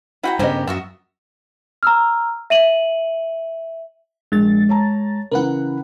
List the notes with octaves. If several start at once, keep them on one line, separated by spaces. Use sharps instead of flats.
E4 F#4 B4 F#5 G5 A#5
G2 C#3 B3 G4 A#4 C5 D#5 G#5
F#2 F4 F#4 D#5 E5
A#5 E6 F6
E5 D#7 F#7
A#1 G#3 A6
C#5 A5 A#5
C#3 E3 A#4 B4 F#5